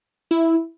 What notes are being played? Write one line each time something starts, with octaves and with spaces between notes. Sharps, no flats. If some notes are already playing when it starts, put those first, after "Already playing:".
E4